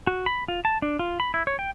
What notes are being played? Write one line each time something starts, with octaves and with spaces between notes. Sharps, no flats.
F#4
B5
F4
A5
D4
F4
B5
E4
C#5
G5